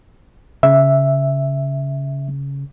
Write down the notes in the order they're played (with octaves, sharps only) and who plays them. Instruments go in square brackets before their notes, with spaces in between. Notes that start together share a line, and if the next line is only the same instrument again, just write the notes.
[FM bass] C#3 [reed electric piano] E5